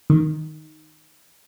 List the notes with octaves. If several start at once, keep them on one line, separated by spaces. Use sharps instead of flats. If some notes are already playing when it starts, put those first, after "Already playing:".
D#3